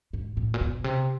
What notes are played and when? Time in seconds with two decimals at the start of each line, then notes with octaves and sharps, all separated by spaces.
0.13 G#2
0.37 A2
0.54 A#2
0.61 B2
0.84 C3